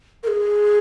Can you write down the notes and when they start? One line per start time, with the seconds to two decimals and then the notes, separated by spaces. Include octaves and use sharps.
0.23 A#4
0.27 G#4